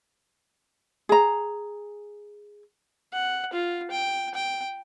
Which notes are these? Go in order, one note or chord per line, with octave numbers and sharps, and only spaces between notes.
G#4 A#5
F#5
F4
G5
G5